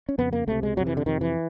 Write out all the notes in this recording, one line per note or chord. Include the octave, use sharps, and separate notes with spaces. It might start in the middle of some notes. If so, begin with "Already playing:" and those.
C#4
F2 C#3 B3
A#3
C#2 C3 A3
G#3
F2 C3 F#3
E3
D3
F2 C3 D#3
E3